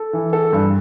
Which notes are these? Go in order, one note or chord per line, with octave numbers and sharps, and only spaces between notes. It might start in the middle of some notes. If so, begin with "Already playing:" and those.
Already playing: A4
E3
A4
G2